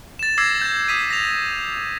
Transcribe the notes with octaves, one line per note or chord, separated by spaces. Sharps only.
A6 E7
D6 E6 G#6 A#6 C7
G6 A6
D#6 B6 D#7
A#6 F7